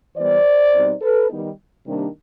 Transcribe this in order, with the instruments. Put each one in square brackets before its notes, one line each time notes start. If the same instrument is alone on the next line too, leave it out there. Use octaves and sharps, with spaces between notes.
[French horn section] E3 G3 B3 C5 D5
B2 G3 C4 D#4
A4 B4
D#3 G3 B3 D#4
C3 D#3 G3 A#3 D4